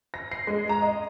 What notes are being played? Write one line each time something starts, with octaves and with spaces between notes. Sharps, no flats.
A#6
C7
G#3
A#5
D#5